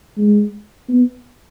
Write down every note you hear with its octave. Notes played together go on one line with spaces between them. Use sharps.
G#3
B3